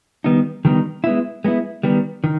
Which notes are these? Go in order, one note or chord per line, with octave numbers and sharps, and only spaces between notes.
D#3 G3 B3 D#4
D#3 G3 B3 D#4
G#3 B3 E4
G#3 B3 E4
D#3 G3 B3
D#3